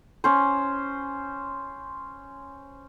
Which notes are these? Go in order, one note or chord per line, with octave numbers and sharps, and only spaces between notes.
C#4 C5